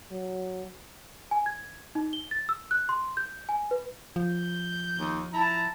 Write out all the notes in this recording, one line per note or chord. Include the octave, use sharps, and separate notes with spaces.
F#3
G#5
G#6
D#4
G7
A6
E6
F#6
C6
G6
G#5
B4
F3 G6
D#2
E4 A5 A#5